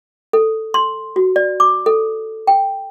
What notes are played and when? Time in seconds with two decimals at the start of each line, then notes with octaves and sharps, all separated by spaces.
0.33 A4
0.74 C6
1.16 F#4
1.36 D5
1.60 D6
1.86 A4
2.47 G5